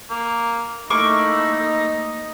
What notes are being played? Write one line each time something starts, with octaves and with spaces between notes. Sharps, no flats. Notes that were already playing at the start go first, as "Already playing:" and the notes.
A#3
A3 A#3 D#4 E4 C#6 D6
D#5